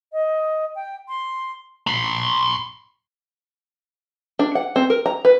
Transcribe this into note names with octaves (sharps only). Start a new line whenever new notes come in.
D#5
G5
C6
B5 C6
D4
F#5
C4
A#4
A#5
B4